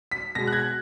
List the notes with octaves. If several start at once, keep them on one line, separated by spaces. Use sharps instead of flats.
B6
B2 G#3 A#6
F#6
G#6